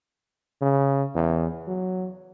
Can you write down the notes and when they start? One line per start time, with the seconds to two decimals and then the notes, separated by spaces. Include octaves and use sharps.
0.62 C#3
1.15 E2
1.67 F#3